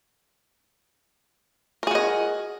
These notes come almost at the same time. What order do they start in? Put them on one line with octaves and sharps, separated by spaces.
A#4 G#4 F#4 D#5